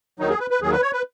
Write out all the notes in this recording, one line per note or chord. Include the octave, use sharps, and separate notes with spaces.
D#2 D#3 F#3 D#4
G#4
B4
B4
D#2 D#3 F#3 G#4
B4
C#5
B4